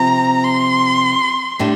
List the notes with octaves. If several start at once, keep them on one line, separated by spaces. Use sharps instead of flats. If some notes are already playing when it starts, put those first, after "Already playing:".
Already playing: C3 F3 C4 A#5
C6
A2 G3 D4